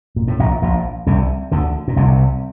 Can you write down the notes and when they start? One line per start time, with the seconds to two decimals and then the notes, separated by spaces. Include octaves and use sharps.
0.16 A#2
0.28 A2
0.39 A#1 A#2
0.62 A#1 A#2
1.06 C2 C3
1.52 D2 D3
1.88 A#2
1.96 C2 C3